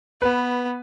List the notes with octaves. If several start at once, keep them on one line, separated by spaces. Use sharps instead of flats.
B3 B4